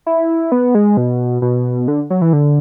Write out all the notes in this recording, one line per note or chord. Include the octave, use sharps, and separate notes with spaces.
E4
B3
G#3
B2
B2
D3
F#3
E3
D3